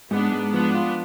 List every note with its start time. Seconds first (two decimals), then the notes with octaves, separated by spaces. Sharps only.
0.10 G#2 B3 D4
0.32 G#2
0.52 F3 B3 D4
0.74 F4